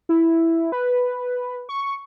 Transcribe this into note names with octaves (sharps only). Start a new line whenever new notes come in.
E4
B4
C#6